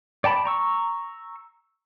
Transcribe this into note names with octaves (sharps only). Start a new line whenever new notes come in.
D5 G5 A5 B5
A#5 C#6 E6